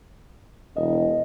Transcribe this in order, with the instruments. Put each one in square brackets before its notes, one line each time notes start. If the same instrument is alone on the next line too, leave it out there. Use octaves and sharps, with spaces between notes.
[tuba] E1 [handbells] D#5